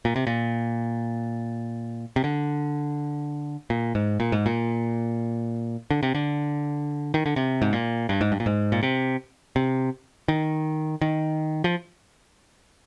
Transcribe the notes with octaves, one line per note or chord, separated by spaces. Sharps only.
A#2
C3
A#2
C3
D3
A#2
G#2
A#2
G#2
A#2
D3
C3
D3
D#3
D3
C3
G#2
A#2
G2
G#2
G2
A#2
G#2
A#2
C3
C3
D#3
D#3
F3